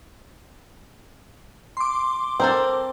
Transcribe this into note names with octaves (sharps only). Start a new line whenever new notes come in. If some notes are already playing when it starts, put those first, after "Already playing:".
C6 D6
C4 A4 A#4 C5